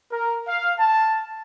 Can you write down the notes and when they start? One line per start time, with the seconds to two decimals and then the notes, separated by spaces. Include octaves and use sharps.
0.11 A#4
0.47 F5
0.79 A5